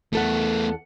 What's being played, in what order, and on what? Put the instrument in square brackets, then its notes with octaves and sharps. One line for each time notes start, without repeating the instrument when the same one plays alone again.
[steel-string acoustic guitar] E2 A4 F#5 [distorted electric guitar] A3 B3